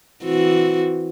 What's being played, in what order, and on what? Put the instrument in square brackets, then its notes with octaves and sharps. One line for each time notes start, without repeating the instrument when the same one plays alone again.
[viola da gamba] E3 C4 F#4